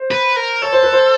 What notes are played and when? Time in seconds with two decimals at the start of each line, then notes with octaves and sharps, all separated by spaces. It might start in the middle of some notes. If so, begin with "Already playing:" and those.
Already playing: C5
0.11 B4
0.36 A#4
0.62 A4 C#5
0.73 C5
0.83 B4
0.93 C5